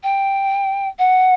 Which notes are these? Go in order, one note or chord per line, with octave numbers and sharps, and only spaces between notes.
G5
F#5